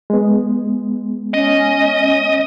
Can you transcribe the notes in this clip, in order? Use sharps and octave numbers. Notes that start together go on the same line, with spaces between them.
G#3 B3
C#4 D#5